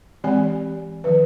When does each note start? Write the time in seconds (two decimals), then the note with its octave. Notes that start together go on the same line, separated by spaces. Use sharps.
0.24 E3 G#3 C4 G4 D5 G#5
1.04 D#3 F3 B4